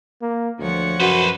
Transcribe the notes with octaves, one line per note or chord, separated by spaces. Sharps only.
A#3
D2 F3 C#5 F#5
F#2 F#4 B4 C5